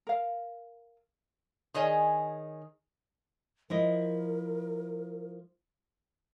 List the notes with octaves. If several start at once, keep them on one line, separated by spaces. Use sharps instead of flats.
A#4 F5
D#3 G#4 C#5 D#5 G#5
F3 E4 A#4 D#5